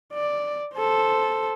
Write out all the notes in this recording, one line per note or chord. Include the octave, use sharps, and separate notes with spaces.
D5
A4 C5